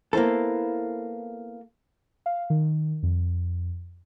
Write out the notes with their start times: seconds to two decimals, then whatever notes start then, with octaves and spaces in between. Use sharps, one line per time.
0.13 A#3 B3 E4 A4 C5
2.26 F5
2.50 D#3
3.03 F2